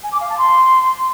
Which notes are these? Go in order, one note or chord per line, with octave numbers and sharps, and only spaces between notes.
G#5
D6
F5
A5
C6